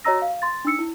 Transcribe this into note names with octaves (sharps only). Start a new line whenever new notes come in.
F#4 C#5 D#5 A#5 E6 A#6
F5
C6 A6
D4 D#4 E6 C#7
E4